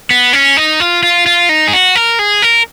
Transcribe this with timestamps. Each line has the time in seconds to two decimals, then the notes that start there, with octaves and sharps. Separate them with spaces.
0.10 B3
0.33 C#4
0.57 D#4
0.80 F4
1.03 F4
1.26 F4
1.49 D#4
1.68 G#4
1.73 F#4
1.95 A#4
2.19 G#4
2.42 A#4